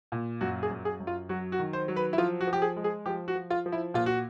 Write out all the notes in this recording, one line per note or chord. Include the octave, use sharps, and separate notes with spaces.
A#2
F#2 F#4
G#4
F#2
G#4
F#2
F4
F#3 F#4
F#4
D#3
C5
F#3
B4
E4
F3 F4
F#4
F3
G4
G#4
G#3
G#4
F3 G4
F#4
F3
F4
F3
E4
A#2 F4
F#4